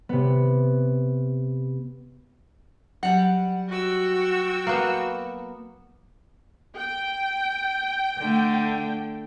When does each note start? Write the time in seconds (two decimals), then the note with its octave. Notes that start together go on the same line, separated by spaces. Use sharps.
0.09 C3 B3
3.03 F#3 G3 F#5
3.68 F#4 G5 E6
4.67 A#3 B3
6.76 G5
8.19 D3 A3